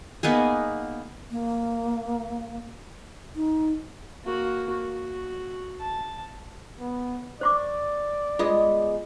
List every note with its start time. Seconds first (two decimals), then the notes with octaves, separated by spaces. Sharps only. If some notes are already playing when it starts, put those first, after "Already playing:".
0.23 A#3 B3 D#4 G#4
1.31 A#3
3.36 D#4
4.24 A#3 F#4
4.70 F#4
5.80 A5
6.80 B3
7.41 C5 D5 C#6 D6
8.39 G#3 B3 F4 D#5